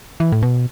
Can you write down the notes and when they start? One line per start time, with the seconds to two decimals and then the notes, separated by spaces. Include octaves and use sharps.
0.20 E3
0.32 A2
0.42 B2